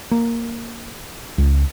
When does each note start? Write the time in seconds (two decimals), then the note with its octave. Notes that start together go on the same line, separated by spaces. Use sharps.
0.11 A#3
1.38 C#2